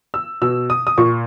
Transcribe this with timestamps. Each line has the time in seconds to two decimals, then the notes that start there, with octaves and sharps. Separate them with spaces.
0.14 E6
0.42 B2 E6
0.70 D#6
0.87 D#6
0.98 A#2 C#6